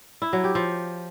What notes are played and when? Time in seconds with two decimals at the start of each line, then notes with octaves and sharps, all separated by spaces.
0.22 E4
0.33 F#3
0.44 G4
0.55 F3